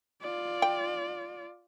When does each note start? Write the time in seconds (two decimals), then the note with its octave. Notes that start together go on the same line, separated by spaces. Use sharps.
0.22 F4 D5
0.62 G5